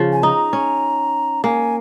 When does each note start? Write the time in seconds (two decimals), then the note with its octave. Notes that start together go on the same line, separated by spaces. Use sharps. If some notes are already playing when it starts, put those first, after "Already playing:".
Already playing: C#3 F3
0.12 G#5
0.23 D#4 A#5
0.53 C#4
1.44 A#3 G#5